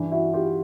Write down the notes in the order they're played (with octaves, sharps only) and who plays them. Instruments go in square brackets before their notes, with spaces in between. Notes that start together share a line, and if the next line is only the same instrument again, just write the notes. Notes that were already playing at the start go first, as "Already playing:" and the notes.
Already playing: [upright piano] G2 E3 D4 E4
E4 F#4
F4 G4